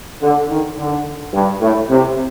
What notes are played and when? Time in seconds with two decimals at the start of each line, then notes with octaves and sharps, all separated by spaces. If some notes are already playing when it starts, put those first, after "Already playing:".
0.21 D3
0.49 D#3
0.77 D3
1.33 G2
1.61 A2
1.89 C3